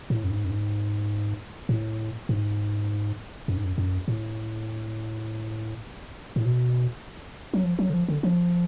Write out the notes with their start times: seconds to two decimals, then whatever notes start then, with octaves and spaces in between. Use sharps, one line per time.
0.10 A2
0.24 F#2
0.31 G#2
0.45 F#2
0.50 G#2
1.69 A2
2.29 G#2
3.48 F#2
3.57 G#2
3.64 F#2
3.78 F#2
4.08 A2
6.36 A2
6.45 B2
7.54 F#3
7.64 F3
7.79 F#3
7.90 D3
7.94 F3
8.08 D3
8.23 F3